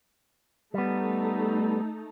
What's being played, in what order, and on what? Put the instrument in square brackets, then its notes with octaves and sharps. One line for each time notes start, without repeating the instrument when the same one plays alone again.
[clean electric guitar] G3 B3 [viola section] A3 D#4 A4